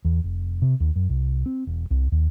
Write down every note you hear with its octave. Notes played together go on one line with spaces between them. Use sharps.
E2
F1
C3
D#2
F#2
C2
C4
E1
C2
D#2